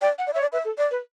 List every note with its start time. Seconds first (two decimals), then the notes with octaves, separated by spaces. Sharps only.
0.02 D5 G5
0.18 F#5
0.27 D5
0.33 C#5 E5
0.41 D5
0.53 B4 E5
0.65 A4
0.78 D5
0.91 B4